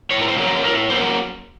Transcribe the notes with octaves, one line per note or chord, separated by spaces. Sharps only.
A2 C#5
A#4
C5
F#3 A#3 C#4
A#4
A2 A#4
F#3 A#3 C#4 C5